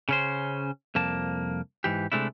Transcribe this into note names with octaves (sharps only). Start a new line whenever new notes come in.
C#3 C#4 C5
C2 F2 A#3 A5
G#2 E3 G4
C3 G#3 A3 D4 E4